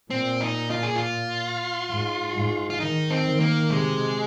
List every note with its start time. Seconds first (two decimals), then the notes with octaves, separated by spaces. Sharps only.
0.10 A#2 C4
0.41 D#4
0.71 F4
0.83 G#4
0.95 F4
1.90 G#2
2.35 G#2
2.70 F4
2.80 D#3 D#4
3.11 C4
3.25 D#3
3.40 A#3
3.70 C3 G#3